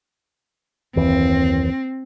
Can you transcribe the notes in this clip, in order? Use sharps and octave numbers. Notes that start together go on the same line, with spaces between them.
F#1 D#2 E3 C4